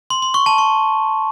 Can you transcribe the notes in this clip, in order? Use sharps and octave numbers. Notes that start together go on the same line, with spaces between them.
C6
C6
C#6
A5
C#6